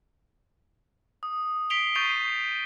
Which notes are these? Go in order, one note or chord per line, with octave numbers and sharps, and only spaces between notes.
D#6
B6 C7 D7 F7 G7
C#6 G6 A6 C7 D#7 F7